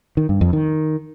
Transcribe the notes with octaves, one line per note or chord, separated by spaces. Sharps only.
D#3
G2
F2
D#3